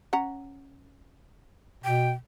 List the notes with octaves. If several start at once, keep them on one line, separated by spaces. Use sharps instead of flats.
C#4 F#5 A#5
B2 G5